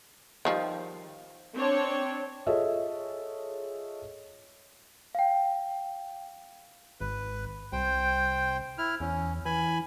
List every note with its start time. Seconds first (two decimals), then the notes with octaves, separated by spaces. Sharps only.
0.45 D#3 F3 G3
1.55 C4 D4 C#5
2.47 F4 G#4 A4 C#5 D#5 E5
5.15 F5 G5
7.00 G#1 B4
7.72 C2 C5 G5
8.78 E4 F6
9.00 E2 C#4
9.45 E3 G#5 B5